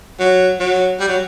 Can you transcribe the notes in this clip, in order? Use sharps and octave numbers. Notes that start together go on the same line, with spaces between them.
F#3
F#3
G3
F#3